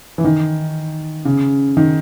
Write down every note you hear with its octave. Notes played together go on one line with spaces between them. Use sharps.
E3
D#3
C#3
D#3